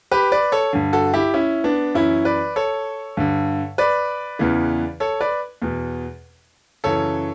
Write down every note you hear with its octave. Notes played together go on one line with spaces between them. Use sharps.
G4 B4
B4 D5
A4 C#5
G2 D3
F#4 A4
E4 G4
C#4 E4
B3 D4
F#2 E3 C#4 E4
B4 D5
A4 C#5
G2 D3
B4 D5
E2 C#3 E3
A4 C#5
B4 D5
E2 B2
F#2 C#3 E3 A4 C#5